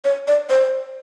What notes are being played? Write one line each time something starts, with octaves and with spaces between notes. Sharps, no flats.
C#5
D5
C5